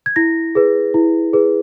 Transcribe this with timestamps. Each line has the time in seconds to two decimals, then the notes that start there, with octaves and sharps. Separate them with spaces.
0.06 G#6
0.16 E4 A#6
0.55 G#4 B4
0.94 E4
1.33 G#4 B4